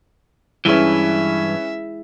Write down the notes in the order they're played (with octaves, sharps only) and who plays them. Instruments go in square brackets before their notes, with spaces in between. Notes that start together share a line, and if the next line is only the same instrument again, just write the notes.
[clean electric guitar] G2 E3 [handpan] G#3 E4 G#4 [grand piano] C#4 B4 [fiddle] E5